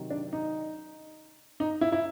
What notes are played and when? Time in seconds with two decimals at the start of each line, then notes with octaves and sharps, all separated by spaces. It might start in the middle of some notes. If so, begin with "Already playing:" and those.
Already playing: C3 D#3 F#3
0.10 D4
0.33 D#4
1.60 D#4
1.81 E4
1.92 E4